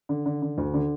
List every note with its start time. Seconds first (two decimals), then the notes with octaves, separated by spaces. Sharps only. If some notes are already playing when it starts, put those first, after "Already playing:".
0.09 D3
0.26 D3
0.42 D3
0.58 D2
0.74 D3